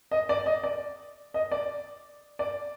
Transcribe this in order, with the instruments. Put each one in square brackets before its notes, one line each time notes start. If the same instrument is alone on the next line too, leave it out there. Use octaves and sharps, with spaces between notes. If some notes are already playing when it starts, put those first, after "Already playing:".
[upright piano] D#5
D5
D#5
D5
D#5
D5
D5